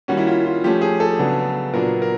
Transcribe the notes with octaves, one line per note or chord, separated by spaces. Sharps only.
D#3 G3 A#3 C#4 F#4
E4
F4
F4
F3 A3 C#4 G4
G#4
A4
C#3 F#3 B3 D4
A#2 F#3 B3 D4 A#4
A#4